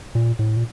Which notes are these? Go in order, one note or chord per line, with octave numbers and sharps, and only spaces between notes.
A#2
A2
A#2